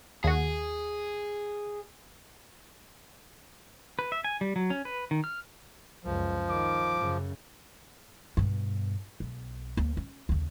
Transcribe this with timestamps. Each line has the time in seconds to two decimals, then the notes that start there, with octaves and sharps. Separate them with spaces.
0.24 D#2 F#4 G#4
3.99 B4
4.12 E5
4.24 G#5
4.41 G3
4.56 F#3
4.70 C#4
4.85 B4
5.11 D#3
5.24 F6
6.04 C#2 F#2 F3
6.49 D#3 D6
6.97 F#2 C#3
8.37 G2 B2
9.20 B1
9.77 D2 A#3
9.97 C#4
10.29 D#2 C#3